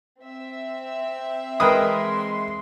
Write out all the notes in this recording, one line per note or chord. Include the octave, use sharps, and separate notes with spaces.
C4 E5
E3 G#3 A#4 B4 G5 C6 D#6